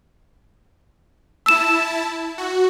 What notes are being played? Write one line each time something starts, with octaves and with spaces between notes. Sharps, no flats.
E4 A5 E6 E7
F#4